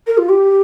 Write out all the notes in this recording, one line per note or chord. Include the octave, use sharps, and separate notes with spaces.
A#4
F4
G4